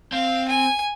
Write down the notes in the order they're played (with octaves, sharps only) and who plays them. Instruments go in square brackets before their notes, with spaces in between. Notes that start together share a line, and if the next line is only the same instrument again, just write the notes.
[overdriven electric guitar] C4 [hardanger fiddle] F5
[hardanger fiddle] G#5